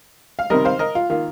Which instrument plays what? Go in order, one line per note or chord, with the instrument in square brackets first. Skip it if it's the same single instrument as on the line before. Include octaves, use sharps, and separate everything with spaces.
[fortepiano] F5
C3 D#3 G3 A#4 D#5
C5 F5
A#4 D#5
F4
D#3 A#3 F4